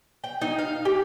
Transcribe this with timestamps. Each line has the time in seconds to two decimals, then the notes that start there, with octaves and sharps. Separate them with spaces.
0.24 G5
0.41 D#4
0.58 F5
0.85 G4